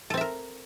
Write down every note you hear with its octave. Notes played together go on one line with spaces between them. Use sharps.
C4 A4 A#4 E5